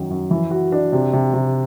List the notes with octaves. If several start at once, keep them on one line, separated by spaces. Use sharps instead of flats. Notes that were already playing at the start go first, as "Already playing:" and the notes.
Already playing: F#2 D#3
F#2
E3
F#4
D4
C3
C3
C3